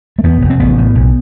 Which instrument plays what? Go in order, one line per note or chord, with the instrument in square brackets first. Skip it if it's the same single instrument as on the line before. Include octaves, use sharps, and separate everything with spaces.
[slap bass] A3
E2 B3
F1
C4
A1 B3
A2
B1